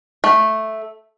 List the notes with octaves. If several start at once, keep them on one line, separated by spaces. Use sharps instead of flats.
A3